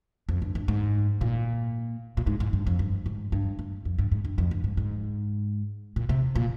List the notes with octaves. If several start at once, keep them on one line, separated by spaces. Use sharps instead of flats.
F2
G2
G2
G#2
A#2
A#2
G#2
G#2
G2
F2
G2
G#2
G2
G2
F2
G2
G#2
G2
F2
G2
G#2
G#2
A#2
C3
A#2